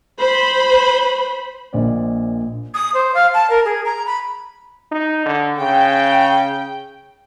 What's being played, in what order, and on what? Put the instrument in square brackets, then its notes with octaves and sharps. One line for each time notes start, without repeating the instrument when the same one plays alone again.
[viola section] C5 B5
[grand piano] A#1 A#2 C5 D5 D#5
[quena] D#6
C5
F5
A5
A#4
G#4
A#5
B5
[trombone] D#4
D3
[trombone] C#3 [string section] G5